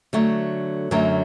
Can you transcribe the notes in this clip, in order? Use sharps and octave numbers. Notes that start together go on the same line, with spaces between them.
D3 F#3 A3
F#2 D3 F#3 A3